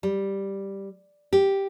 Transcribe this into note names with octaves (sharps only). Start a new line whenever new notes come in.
G3
G4